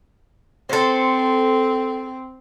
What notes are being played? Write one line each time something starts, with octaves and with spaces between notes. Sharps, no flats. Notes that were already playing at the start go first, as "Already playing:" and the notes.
C4 A4 C5